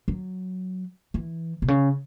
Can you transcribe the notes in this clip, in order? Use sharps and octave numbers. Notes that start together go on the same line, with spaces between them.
F#3
E3
B2
C#3